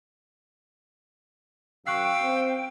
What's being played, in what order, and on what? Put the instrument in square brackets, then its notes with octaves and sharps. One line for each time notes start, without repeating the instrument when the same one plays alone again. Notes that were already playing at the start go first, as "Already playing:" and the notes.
[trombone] F#2 [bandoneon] F5 E6 [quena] G5 [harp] C#6 F#6 C7
[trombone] C4